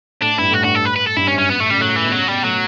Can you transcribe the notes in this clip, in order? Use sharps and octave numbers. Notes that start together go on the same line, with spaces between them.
A2 D4
G2 E4
A2 F#4
G2 F#4
A4
B4
B4
A4
G2 E4
C#4
F#2
C#4
B3
A2 A3
C#3 G3
A2 F#3
E3
B2
C#3 F#3
B2 G3
A2 F#3